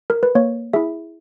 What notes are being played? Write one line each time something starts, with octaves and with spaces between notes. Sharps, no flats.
A#4
B4
A#3 C#5
E4 G#4 E5